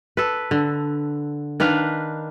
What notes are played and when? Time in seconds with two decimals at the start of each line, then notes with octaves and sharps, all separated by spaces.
0.17 A4 B4
0.51 D3
1.60 D#3 D4 B4 F5